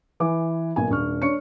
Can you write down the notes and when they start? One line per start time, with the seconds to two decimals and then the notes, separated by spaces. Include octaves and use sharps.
0.20 E3 B4 G#5 D6
0.76 B1 A#3 G#5
0.89 D#1 D4 C#6 F6
1.22 D4 C#5 C#6 C#7